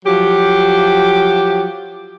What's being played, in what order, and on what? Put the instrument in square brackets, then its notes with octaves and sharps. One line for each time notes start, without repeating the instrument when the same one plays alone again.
[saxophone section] F3 F#3 G4